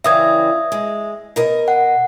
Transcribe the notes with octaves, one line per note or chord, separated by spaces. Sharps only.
C#3 E3 G3 E5 D#6 G#6
G#3
B2 A#4 D#5
F#5